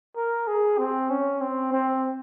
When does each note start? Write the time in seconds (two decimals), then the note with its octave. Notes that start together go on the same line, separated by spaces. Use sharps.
0.16 A#4
0.47 G#4
0.78 C4
1.10 C#4
1.41 C4
1.73 C4